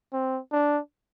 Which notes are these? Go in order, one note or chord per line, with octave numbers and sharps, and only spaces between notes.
C4
D4